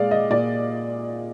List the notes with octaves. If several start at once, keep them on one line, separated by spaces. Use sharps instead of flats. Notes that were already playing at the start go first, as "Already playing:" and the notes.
Already playing: A#2 G#3 D5 F5
D#5
A#2 D5